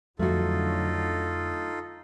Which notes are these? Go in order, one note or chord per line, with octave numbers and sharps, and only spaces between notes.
F2 D3 F#3 A3 D#4 F4 F#4 A4